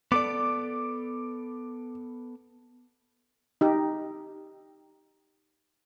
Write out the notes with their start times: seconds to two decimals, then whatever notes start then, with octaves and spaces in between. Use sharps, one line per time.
0.12 B3 A4 D5 D6
3.61 D#4 G4